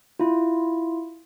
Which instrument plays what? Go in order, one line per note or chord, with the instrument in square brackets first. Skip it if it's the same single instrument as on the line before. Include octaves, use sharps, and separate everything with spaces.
[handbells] E4 F4